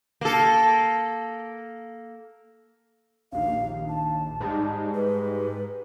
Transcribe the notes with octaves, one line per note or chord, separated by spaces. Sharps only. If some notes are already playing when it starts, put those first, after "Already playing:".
A#3 A4
A#1 D#2 F5
A5
G#2 G3 G#3
B4